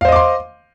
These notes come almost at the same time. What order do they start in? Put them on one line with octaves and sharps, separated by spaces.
F5 C5 D#5 D6 C6